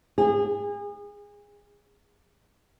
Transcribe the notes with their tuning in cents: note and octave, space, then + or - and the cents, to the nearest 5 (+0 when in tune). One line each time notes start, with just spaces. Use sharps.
G#4 -35